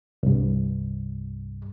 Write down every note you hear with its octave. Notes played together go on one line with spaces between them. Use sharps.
C2 G2